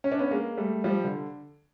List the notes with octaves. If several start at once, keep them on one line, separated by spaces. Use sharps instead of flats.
C#4
D4
B3 C#4
G#3 A#3
G3 A3
F3 G3
D3